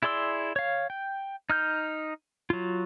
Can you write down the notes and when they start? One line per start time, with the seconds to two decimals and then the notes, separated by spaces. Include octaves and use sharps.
0.03 E4 G#4 D5 C6 E6
0.56 C#5 F5
0.90 G5
1.50 D#4 F6 G6
2.50 F#3 F4